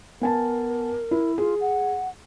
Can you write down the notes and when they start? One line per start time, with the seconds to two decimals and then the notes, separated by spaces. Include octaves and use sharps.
0.21 B3 A#4 G#5 A5
1.11 E4
1.38 F4 G#4
1.61 F#5